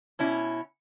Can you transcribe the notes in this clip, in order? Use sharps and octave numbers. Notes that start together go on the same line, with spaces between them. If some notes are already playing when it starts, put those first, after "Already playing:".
B2 C#4 E4